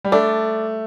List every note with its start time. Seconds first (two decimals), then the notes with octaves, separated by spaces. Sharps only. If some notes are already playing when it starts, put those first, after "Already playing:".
0.04 G3
0.12 A3 D4